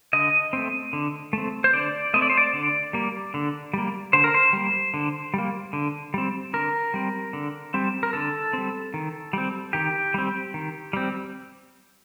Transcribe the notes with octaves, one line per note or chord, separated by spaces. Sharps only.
D3 D#5
A3 C4
D3
A3 C4
C5
D3 D5
A3 C4 D#5
D5
C5
D5
D3
G3 A#3
D3
G3 A#3
D3 C5
A#4
C5
G3 A#3
D3
G3 A#3
D3
G3 C4
D3 A#4
G3 C4
D3
G3 C4
A#4
D3 A4
G3 C4
D#3
G3 C4
D#3 G4
G3 C4
D#3
G3 C4